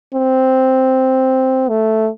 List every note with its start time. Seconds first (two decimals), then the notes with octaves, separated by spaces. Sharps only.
0.14 C4
1.69 A3